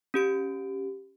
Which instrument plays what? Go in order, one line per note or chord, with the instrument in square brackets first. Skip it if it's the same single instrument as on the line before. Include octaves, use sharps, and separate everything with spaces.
[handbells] C#4 G4 D7